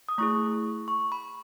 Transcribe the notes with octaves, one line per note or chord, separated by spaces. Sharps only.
D#6
A3 E4 G#4 C#6
C#6
B5